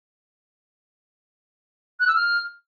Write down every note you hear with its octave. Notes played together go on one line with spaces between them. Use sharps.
F#6
E6
F6